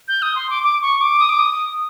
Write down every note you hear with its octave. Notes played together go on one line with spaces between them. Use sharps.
G6
D#6
C6
D6
D6
C#6
D6
D#6
D6
D#6